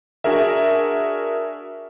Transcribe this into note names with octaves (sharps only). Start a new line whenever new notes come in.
D4 F#4 G#4 A#4 E5